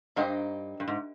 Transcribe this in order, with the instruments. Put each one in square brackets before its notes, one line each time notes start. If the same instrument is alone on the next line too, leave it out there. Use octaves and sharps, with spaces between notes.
[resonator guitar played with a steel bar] G2 [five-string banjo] A#3 D#4 G4 C5 D#5
[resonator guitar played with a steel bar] G2
G#2